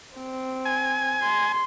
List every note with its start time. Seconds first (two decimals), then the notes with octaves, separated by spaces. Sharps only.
0.17 C4
0.65 G#5
1.22 C6